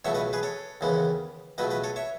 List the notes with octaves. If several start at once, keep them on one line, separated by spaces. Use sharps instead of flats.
C#2 B2 F#3 A3 C#5 E5
B4 D#5
G#4 B4
A4 C#5
D#2 C#3 E3 G#3 B3
C#2 B2 F#3 A3 B4 D#5
B4 D#5
A4 C#5
C#5 E5